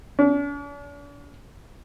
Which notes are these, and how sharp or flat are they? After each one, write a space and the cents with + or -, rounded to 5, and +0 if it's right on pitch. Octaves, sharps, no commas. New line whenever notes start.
D4 -45